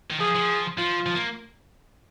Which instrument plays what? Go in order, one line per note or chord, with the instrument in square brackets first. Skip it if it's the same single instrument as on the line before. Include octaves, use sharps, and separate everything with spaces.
[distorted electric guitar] D#3
[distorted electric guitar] F3 [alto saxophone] G#4
[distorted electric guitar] F3
[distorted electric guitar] F3 [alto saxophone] F4
[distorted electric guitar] F3
A#3